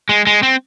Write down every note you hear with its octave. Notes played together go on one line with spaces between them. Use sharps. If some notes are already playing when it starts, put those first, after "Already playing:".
G#3
G#3
C4